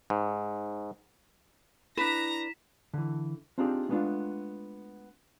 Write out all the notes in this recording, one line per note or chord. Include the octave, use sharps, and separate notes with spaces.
G#2
D4 E4 B4 A#5 A#6 B6 E7
D3 E3
C4 D4 D#4 F4 G4 G#4
G#3 A3 B3 C#4 D4 F4